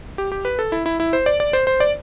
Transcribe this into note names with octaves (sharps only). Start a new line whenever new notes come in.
G4
G4
B4
A4
E4
E4
E4
C5
D5
D5
C5
C5
D5